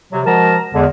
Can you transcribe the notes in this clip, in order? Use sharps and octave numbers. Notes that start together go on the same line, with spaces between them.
C3 F#3
F3 G#3 F#4 A#4 A5 A#5
E2 D3 G#3